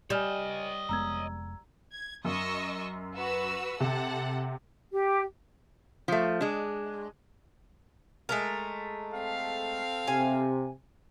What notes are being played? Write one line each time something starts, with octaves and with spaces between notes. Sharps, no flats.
G3 C#5 D#5 G#5 F6 E7
F1 G#3 B3 A#5 E6 G#6
G#6
F#2 D#5 C#6 E6
F#4 B4 E6
C3 A4 F#5
G4
F3 A3
G#3 D4
G#3 A3 A#4
C4 A4 F5
C3 G#5